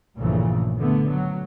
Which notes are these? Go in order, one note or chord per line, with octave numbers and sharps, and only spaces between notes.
A#1 G2 A#2 C#3 E3 A3
D3 A3 B3
F#3